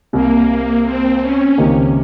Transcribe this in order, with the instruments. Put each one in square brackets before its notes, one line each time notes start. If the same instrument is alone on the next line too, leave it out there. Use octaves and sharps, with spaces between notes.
[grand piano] C2 C3 G3 [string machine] A#3
[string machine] C4
C#4
[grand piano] C#2 C3 D#3 A#3